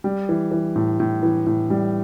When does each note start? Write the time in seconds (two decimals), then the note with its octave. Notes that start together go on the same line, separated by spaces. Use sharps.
0.04 G3
0.29 E3
0.51 E3
0.76 A2
1.00 A2
1.23 E3
1.46 A2
1.70 G3